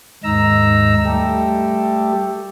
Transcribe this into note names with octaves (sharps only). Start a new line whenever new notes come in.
D#2 G#2 D#4 A#5 E6
G3 A3 G4 A4